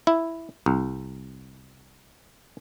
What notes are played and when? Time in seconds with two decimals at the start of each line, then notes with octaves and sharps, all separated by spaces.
0.07 E4
0.66 C2